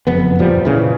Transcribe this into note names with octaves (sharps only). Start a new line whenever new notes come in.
F#1 F2 B3
D#1 A#2 F3 G3
A#2 C#3 E3